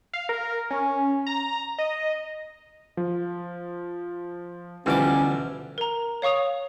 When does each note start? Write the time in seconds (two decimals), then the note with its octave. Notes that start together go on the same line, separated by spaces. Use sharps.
0.13 F5
0.29 A#4
0.70 C#4
1.26 A#5
1.78 D#5
2.97 F3
4.86 D2 B2 E3 F3 G3 C#4 D6
5.78 A#4 A#5
6.22 C#5 F5 C#6 D#6 F7